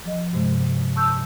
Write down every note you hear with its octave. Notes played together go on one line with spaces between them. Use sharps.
F3 D#5
G2 C3 G#3
A5 C#6 E6 G6